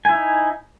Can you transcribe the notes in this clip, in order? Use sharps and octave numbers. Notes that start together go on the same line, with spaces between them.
D#4 E4 G#5